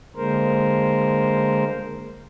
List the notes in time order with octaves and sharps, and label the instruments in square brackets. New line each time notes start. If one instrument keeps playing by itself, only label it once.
[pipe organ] D3 G#3 A#3 A#4 C5